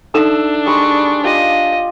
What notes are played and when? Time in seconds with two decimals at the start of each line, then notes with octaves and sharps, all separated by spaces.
0.14 D4 D#4 A4 E5 E7
0.66 G3 G#3 C#6 D#6
1.24 F4 G4 D5 D#5